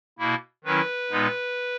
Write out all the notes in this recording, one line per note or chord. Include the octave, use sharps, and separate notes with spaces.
B2 A#3 E4
D#3 F#3 C#4 E4 B4
A#2 G#3 B3 D#4